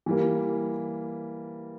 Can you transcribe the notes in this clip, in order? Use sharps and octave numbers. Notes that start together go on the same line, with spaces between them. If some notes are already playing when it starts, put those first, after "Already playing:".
E3 G3 A#3